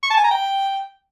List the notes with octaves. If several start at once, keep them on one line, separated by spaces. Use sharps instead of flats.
C#6
A5
G#5
A#5
G5